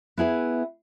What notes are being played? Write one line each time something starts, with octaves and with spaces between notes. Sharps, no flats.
B3 E4 G#4 B4